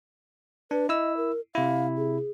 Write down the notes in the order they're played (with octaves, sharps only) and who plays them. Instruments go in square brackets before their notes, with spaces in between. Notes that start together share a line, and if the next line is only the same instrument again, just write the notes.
[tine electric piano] D4 [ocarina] B4
[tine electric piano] E4 E6 [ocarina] D#5
[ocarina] A#4
[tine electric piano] C3 E4 [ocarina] F5
[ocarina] G#4